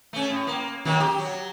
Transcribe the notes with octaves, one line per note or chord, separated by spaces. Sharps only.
A3 C#4
A2
A#3
D#3 F#3 A#3
G4
F#3